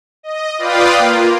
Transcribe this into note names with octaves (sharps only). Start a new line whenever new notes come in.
D#5
F4 B4 D5 F5 G5 D#6
A#3 F4